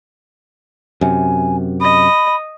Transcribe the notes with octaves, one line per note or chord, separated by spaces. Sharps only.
F#2 C3 G#5
D#5 B5